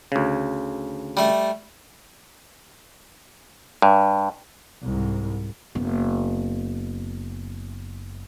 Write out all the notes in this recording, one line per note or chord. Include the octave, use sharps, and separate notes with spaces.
D2 C#3
G3 A3
G2
C2 G#2
F#1 B3